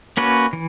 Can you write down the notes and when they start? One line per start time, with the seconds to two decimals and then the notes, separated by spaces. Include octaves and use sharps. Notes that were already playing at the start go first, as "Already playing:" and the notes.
0.17 A#3 C#4 F#4 B4
0.53 E3